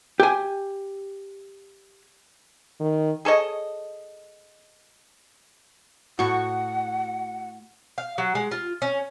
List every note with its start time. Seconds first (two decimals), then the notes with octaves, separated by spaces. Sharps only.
0.20 G4 G#5
2.80 D#3
3.25 G#4 A4 C#5 D#5
6.19 A2 F#4 F#5 C#6
7.98 F5
8.18 F#3
8.35 G#3
8.51 F4
8.82 C#4